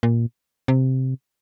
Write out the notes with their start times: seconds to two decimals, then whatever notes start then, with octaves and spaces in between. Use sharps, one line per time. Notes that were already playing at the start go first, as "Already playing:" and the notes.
0.03 A#2
0.68 C3